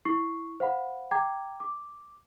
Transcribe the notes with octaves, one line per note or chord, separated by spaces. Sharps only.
E4 C#6 C7
C5 F5 F#5 B5
G5 A#5 D6 G#6
D6